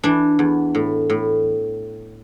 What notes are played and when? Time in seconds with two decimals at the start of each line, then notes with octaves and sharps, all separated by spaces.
0.04 E3 D4
0.39 E2
0.75 A2
1.10 A2